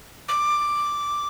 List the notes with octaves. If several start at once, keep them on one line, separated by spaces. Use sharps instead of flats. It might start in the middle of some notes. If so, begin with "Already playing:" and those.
D6